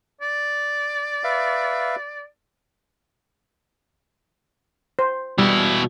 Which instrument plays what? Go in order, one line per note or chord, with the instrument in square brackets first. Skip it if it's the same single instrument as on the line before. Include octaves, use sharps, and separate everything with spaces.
[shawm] D5
[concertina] B4 E5 F5
[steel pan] C5
[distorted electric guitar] B2 E4 [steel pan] G3